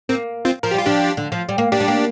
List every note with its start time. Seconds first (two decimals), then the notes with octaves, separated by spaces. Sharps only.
0.09 A#3 C4
0.45 C4 F4
0.63 F3 A#4
0.71 G4
0.74 G3 F4
0.86 F3 D4 G4
1.17 D3
1.32 F3
1.49 G3
1.58 A#3
1.72 A#3 D4 G4
1.80 G3
1.88 A#3